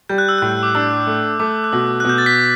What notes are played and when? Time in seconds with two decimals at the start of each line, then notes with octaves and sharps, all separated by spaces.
0.09 G3 G6
0.18 F#6
0.29 E6
0.39 A2 F#6
0.63 D6
0.75 D4 E6
1.07 A3
1.40 A3 D6
1.64 F#6
1.72 B2 E6
2.00 F#6
2.05 B2 G6
2.18 A6
2.26 B6